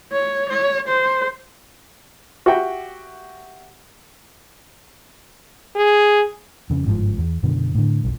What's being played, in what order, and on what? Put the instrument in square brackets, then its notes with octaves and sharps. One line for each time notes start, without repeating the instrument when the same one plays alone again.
[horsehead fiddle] C#5
C#5
C5
[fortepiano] F#4 G4 E5 G5
[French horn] G#4
[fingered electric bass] F2 C#3
G1 G#2 D3 F3
E2
F#2 B2 D3
A2 D3
F1 B1